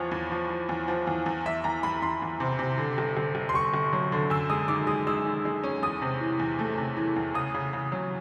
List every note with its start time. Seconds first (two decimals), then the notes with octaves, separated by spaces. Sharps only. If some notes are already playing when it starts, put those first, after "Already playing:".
Already playing: E2 F3 C#5
0.12 E2
0.31 F3
0.50 F3
0.69 E2
0.88 F3
1.07 E2
1.26 E2
1.45 E2 E5
1.64 E2 A#5
1.83 E2 B5
2.02 E2 C6
2.22 E2
2.40 C3
2.59 C3
2.78 D3
2.98 G1
3.17 G1
3.35 G1
3.49 C6
3.54 G1 C#6
3.74 G1
3.93 F#3
4.12 D3
4.30 F#2 E6
4.50 G#3 D#6
4.68 D#3 D6
4.87 G#3 D#6
5.07 G#3 E6
5.26 D#3
5.45 G#3
5.63 C#4
5.83 E2 D#6
6.02 C3
6.20 E3
6.39 E2
6.59 A3
6.78 C3
6.97 E3
7.16 E2
7.34 C#3 D#6
7.55 C#3
7.73 C#3
7.92 F#3